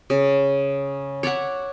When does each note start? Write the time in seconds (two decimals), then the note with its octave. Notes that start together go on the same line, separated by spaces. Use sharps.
0.10 C#3
1.23 C#5 D5 E5 F#5